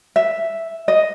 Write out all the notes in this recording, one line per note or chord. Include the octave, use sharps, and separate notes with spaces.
E5
D#5